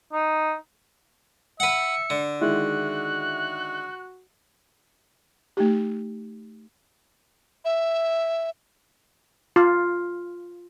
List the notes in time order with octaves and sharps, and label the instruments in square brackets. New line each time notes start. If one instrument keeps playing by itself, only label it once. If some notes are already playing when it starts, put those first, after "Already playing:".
[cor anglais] D#4
[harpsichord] B4 F#5 [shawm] E5 [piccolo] C#7
[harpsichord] D3
[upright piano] D#3 G#3 E4 [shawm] F#4 [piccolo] F#6
[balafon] A3 D#4 G4
[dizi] E5
[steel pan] F4